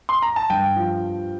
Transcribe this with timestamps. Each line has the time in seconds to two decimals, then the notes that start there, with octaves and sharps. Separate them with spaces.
0.09 C6
0.22 A#5
0.36 A5
0.50 G2 G5
0.76 F3